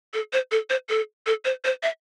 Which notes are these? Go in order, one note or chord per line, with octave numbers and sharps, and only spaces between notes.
A4
C5
A4
C5
A4
A4
C5
C5
E5